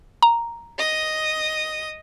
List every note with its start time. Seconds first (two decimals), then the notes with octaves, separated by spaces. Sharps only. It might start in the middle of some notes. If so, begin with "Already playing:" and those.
0.22 A#5
0.78 D#5 D#6